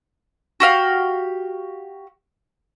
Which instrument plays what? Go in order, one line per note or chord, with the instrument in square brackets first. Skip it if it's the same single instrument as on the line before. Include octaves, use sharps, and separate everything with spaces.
[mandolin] F#4 G4 F5